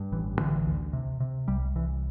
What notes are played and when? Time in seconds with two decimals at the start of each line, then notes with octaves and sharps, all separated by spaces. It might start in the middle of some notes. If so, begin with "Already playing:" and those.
Already playing: G2
0.12 A1 E3
0.39 D3 E3
0.67 D2
0.93 C3
1.20 C3
1.48 C2 G3
1.76 C2 E3